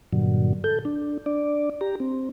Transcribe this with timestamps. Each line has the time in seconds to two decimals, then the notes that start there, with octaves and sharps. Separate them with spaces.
0.13 G2 A#2 D3 F#3
0.64 A4 G6
0.85 D4
1.26 D4 D5
1.81 G4 A#5
2.00 C4